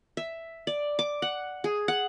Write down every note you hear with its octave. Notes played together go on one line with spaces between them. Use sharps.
E5
D5
D6
F#5
G#4
F#5